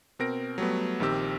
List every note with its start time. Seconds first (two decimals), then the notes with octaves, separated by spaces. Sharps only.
0.19 B2 C4 A#4 A#6 D7
0.58 F#3 G3 A3 B3
1.00 A#1 D#3 C4 G4 E6